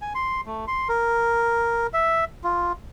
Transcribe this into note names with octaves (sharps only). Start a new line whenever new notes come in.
G#5
C6
A3
C6
A#4
E5
F4